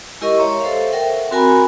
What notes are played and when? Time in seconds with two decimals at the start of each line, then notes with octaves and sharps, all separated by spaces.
0.21 G#3 E4 G4 A#4 D#5 C#6
0.37 C#5 E5 A#5 C6 C#6
0.60 A4 C5 E5 F5
0.92 A#4 E5 F#5 G5
1.31 C4 F#4 A#4 G#5 A#5 B5